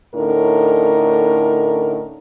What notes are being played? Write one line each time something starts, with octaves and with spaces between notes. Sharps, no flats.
A2 D3 C#4 D#4 A#4